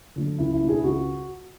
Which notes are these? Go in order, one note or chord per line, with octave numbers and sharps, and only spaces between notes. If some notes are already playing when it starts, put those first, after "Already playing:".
D3 F#3 A3
C#2 E4
E4
B2 A3 D4
E4 G#4
C#2 F#4